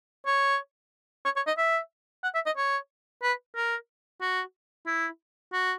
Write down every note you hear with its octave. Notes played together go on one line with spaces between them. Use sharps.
C#5
C#5
C#5
D#5
E5
F#5
E5
D#5
C#5
B4
A#4
F#4
E4
F#4